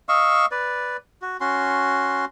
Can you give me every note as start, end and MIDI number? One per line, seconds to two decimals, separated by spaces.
0.09 0.46 75
0.09 0.46 77
0.09 0.46 85
0.09 0.46 88
0.51 0.97 71
0.51 0.97 74
1.22 1.37 66
1.41 2.25 61
1.41 2.25 66
1.41 2.25 84